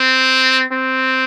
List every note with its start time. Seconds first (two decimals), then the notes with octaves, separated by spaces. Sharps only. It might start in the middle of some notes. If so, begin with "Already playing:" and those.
Already playing: C4
0.72 C4